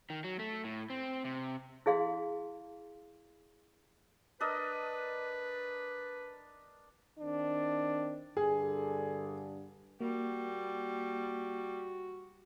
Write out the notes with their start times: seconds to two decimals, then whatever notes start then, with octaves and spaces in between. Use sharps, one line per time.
0.10 D#3
0.24 F#3
0.39 A3
0.64 A2
0.90 C4
1.25 C3
1.86 E4 G#4 F5 C6
4.40 D4 A#4 B4 D#5
7.19 D#3 C4 D4
8.37 G2 D3 G#4
10.01 G3 A#3 F#4